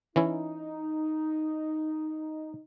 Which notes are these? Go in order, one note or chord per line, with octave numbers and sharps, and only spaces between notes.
E3 C#4 D#4 E4